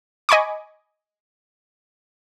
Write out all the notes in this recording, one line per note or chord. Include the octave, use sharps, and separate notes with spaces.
D#5 G#5 B5 C#6 D6